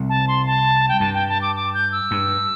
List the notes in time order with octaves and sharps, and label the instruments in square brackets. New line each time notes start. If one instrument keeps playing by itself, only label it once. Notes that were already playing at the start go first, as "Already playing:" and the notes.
Already playing: [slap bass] C2 C3
[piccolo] A5
C6
A5
G5
[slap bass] G2 [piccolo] A5
[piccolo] G5
A5
D6
D6
G6
E6
[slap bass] G2